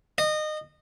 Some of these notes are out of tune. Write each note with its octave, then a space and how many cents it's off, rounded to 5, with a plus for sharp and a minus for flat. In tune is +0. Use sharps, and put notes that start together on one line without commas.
D#5 -25